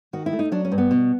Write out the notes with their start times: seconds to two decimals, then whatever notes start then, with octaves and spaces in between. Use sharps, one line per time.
0.13 D#3 F#4
0.26 E4
0.33 A3
0.39 D#4
0.52 F#3 D4
0.65 C#4
0.72 G2
0.78 B3
0.91 B2